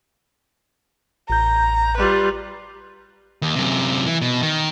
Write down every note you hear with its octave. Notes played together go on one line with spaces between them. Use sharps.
A1 A#5 G6
G3 F4 B4
D#2
F#2 C3
E3
B2
D#3